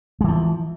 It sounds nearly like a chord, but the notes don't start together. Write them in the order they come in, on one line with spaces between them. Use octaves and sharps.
G#3 E3 F3